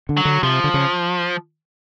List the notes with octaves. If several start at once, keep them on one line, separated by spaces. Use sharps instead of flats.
D3
F#3
D3
C3 F3
D3
C#3